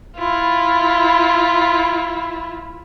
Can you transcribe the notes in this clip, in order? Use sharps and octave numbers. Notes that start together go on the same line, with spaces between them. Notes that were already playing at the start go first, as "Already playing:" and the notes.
E4 F4